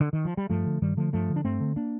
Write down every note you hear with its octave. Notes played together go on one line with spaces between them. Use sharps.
D3
D#3
F3
G3
G2 F3 A3
D3
G2 D#3 G3
D3 F3 A3
G2 F3 A3
D3
D4
G2 A3 C4
D3
A#3 D4